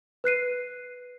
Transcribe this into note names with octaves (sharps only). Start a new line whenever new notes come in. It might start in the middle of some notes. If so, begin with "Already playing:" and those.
B4 F#6 C7 D#7